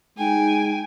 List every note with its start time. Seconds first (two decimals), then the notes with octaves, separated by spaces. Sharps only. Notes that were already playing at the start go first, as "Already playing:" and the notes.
0.19 G#3 D#4 G5 G#5